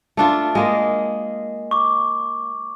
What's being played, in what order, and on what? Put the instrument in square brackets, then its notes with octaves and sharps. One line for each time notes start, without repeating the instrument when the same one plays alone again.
[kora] A3 D4 F4
G#3 A#3 D#5
[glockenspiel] C#6 D6